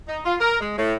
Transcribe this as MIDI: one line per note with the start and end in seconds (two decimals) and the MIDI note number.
0.09 0.19 63
0.26 0.36 65
0.40 0.57 70
0.61 0.76 56
0.78 0.95 45